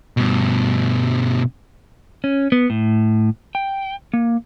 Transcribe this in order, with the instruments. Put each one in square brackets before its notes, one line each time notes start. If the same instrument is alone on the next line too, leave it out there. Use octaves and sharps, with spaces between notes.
[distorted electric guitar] G2 B2
[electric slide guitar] C#4
B3
A2
G5
A#3